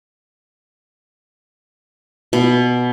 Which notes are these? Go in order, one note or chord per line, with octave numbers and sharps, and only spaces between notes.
B2